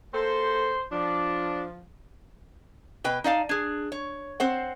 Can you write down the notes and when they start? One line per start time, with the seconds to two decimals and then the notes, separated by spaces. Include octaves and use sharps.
0.14 A#3 A4 C5
0.91 F3 D4
3.04 B2 B4 G5
3.24 D#4 D5 F5 A5
3.49 D4 G#4
3.92 C#5
4.40 C4 C5 F#5